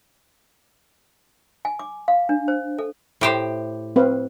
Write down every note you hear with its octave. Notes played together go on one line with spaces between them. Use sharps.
G#5
D6
F5
D4
C5
A4
A2 G4 C5
C4 B4 F5